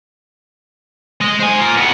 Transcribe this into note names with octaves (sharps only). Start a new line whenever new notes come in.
G#3 D#5
C5 G#5
F4 A#4
F2 B3